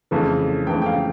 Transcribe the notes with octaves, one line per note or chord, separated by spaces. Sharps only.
F2 C#3 E3 A3
F2 C#3 E3 A3 G5
G5
F5